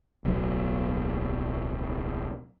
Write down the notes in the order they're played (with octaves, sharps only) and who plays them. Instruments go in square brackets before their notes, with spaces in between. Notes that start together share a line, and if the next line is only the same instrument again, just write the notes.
[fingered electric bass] D1 B1 F#3